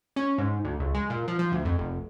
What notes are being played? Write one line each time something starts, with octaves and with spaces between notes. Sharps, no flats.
C#4
G#2
D2
C#2
G#3
A#2
F3
F3
D2
F2
F1